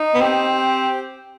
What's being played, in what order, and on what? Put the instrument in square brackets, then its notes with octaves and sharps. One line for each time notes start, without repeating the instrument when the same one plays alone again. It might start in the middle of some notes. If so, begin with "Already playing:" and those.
Already playing: [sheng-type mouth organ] D#4
[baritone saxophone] B3
[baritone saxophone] C4 [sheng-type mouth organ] G4
[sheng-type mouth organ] G4